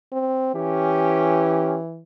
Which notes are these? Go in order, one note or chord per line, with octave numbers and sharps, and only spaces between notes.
C4
E3 C#4 G4